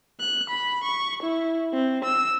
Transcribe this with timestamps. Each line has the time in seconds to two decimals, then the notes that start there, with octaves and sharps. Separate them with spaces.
0.20 F#6
0.49 B5
0.84 C#6
1.23 E4
1.73 C4
2.04 E6